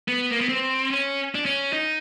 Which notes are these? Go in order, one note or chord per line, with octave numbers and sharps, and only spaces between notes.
B3
A#3
B3
C4
C#4
D4
C#4
D#4